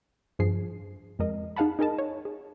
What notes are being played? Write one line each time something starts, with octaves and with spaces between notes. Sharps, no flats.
G2 F3 G#4 C7
F2 G#3 A#4 D#5
D#4 G#4 F5 F#5 A5 B5
D#4 G#4 A#4 D#5 A5
C#5
G#4